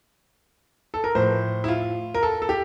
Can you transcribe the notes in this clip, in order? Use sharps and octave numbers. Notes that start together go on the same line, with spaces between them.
A4
A#4
A2 F3 C5
E4
F4
A#4
A4
A4
G4